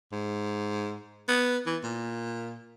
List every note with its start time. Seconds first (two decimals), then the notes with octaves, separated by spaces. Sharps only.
0.12 G#2
1.28 B3
1.66 E3
1.84 A#2